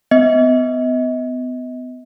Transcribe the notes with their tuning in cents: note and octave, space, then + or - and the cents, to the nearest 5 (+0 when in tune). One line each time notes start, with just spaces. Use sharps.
B3 +30 D#5 +35